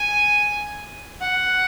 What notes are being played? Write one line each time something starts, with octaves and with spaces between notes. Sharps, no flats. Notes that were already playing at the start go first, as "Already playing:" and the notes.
Already playing: G#5
F#5